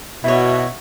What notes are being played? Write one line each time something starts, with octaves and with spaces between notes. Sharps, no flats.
B2 E4 F#4 C#5 E5